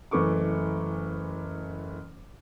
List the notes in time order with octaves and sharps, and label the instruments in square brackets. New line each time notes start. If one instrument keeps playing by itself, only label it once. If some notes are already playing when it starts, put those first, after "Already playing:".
[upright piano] F#1 E3 A3 C#6 D6